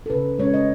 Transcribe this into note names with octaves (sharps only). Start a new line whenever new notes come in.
A4
C#3 B4
G#3 C#4 C#5
D#5